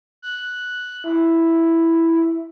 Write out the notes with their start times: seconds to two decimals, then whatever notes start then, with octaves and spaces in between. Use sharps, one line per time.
0.22 F#6
1.04 E4